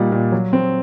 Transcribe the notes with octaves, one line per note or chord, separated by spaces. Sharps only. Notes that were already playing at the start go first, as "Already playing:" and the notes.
Already playing: A#2 G3 D#4
A#2
F#3
C4